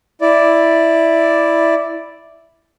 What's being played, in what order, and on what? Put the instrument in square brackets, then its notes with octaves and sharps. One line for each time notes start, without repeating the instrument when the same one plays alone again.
[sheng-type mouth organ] E4 D5